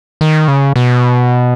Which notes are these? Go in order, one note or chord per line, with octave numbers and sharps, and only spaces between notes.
D#3
C#3
B2